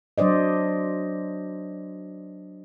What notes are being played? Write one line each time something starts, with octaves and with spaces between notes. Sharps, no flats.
F#3 D4 C5 D5 D#5